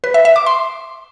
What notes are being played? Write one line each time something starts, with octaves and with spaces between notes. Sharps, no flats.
B4
E5
E5
D6
C6